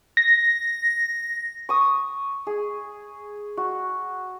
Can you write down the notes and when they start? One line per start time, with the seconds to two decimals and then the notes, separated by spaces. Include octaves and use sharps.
0.17 A#6
1.69 C#6 D#6
2.47 G#4
3.57 F#4